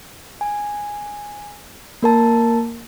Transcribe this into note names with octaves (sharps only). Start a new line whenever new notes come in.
G#5
A#3 A#4 A5